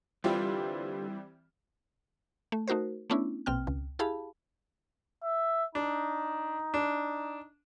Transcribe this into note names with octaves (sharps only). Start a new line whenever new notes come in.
D3 E3 G3 C4 F4 G4 B4 E5
A3
A3 D#4 F#4 A#4 C5
A3 B3 C#4 D4 E4
A#1 B2 C4 G5 F6
C#2
E4 G4 G#4 F5 A5 B5
E5
D4 D#4
D4